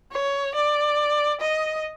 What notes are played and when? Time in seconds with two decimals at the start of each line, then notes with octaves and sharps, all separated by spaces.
0.12 C#5
0.54 D5
1.40 D#5